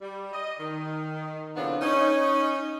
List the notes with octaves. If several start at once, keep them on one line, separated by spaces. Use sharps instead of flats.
G3
D#5
D#3
A2 C#3 F3 B3 C4 D4
C#4 D#4